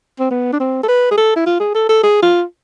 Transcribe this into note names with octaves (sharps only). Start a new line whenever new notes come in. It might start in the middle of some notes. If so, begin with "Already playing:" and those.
C4
B3
D4
C4
A4
B4
G#4
A4
E4
F4
G#4
A4
A4
G#4
F4